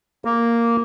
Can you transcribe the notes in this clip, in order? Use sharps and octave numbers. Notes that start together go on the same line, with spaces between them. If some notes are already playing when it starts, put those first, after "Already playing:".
A#3